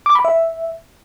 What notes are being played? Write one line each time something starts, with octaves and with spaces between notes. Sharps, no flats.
D6
B5
E5